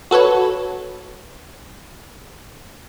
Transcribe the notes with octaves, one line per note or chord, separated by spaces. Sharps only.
F#4 A4 B4 C#5